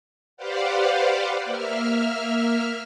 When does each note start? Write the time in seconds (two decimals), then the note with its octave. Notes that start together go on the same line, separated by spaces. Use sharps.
0.37 G4 B4 C5 D5 F5 F#5
1.45 A#3 E5 F6